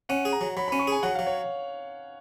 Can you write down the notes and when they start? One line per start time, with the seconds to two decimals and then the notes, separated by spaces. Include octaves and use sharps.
0.09 C#4 F#5
0.25 G#4
0.33 A#5
0.41 F#3
0.57 F#3 B5
0.68 B5
0.72 C#4
0.79 C#6
0.87 G#4 G#5
1.03 F#3 F#5
1.15 F5
1.19 F#3
1.26 C#5